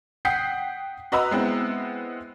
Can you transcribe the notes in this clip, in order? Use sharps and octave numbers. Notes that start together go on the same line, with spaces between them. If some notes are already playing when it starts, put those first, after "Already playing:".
F#5 G5 D#6 G6 B6 C7
F#4 B4 D#5 A#5 B5 E6
G#3 B3 C4 E4